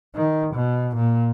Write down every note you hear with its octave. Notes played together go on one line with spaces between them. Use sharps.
D#3
B2
A#2